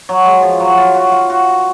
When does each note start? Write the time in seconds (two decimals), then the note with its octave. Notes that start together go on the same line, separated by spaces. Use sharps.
0.09 F#3
0.26 G#3
0.43 F3
0.60 F#3
0.78 F4
0.95 F#4
1.12 F4
1.30 F#4